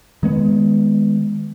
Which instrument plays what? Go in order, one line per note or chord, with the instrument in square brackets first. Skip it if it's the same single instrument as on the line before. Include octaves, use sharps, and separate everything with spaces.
[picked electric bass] D#3 G#3 B3